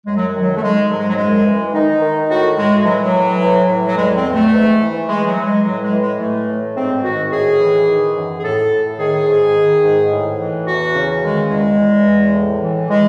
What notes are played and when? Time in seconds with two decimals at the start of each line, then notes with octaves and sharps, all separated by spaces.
0.06 F#2 G#3
0.17 F#3
0.34 D#3 F#3
0.57 A3
0.62 D#3 G#3
0.90 G#2 F#3
0.99 G#3
1.08 F#3
1.18 F#2 G#3
1.46 E3
1.74 D#3 D#4
2.02 D#3
2.29 A2 F#4
2.57 A2 G#3
2.85 E3 F#3
3.02 F#3
3.13 A2
3.41 E3
3.69 A2
3.87 F#3
3.97 E2 G#3
4.15 C4
4.25 E2
4.34 A3
4.53 G#2
4.81 E3
5.09 E3 G#3
5.27 F#3
5.36 E3
5.46 G#3
5.64 A2 F#3
5.83 G#3
5.92 E3
6.02 G#3
6.20 A2 A3
6.48 A2
6.76 G#2 C4
7.04 D#3 F#4
7.31 A2 G#4
7.59 E3
7.88 D#3
8.15 F#2
8.39 G#4
8.43 A2 A4
8.72 A2
8.99 D#3 G#4
9.27 G#2
9.55 D#3
9.83 G#2
10.10 A2
10.39 E3
10.66 E2 F#4
10.95 C#3
11.23 D#3 G#3
11.50 E2 G#3
11.78 E2
12.06 E2
12.34 A2
12.62 E3
12.90 E3 G#3